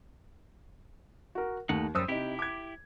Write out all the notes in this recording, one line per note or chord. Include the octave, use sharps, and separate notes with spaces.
F#4 A#4
D#2 A3 D#4 F#5
F#2 G3 C5 D#6 E6
C3 D#4 E4 G4
D6 G#6